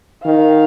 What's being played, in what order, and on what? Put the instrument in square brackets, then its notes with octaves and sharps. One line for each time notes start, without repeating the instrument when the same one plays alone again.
[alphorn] D#3 [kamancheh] F5